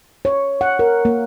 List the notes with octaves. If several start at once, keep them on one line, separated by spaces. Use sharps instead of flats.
C#5
F#5
A#4
A#3